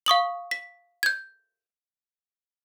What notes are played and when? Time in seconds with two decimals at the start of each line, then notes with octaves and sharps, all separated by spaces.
0.06 F5 C#6 D#6 F#7
0.51 B6
1.03 G6 G#6